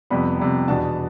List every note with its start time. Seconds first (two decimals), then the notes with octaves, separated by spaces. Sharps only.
0.10 F2 C3 G3 B3 B5
0.39 F2 C3 G3 B3
0.68 E2 B2 B3 D4 A5